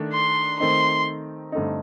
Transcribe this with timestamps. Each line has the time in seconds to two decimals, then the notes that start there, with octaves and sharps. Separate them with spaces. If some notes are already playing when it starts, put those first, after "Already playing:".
Already playing: D#3 A3 D4
0.13 C6
0.60 D#3 A3 C4 D#4 C6
1.52 G2 D3 A3 C4 D#4